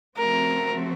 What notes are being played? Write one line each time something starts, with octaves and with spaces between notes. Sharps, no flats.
C#3 F3 A3 C4 F#4 A#4